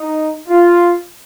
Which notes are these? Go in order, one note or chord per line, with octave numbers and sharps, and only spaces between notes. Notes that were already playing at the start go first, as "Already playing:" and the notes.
Already playing: D#4
F4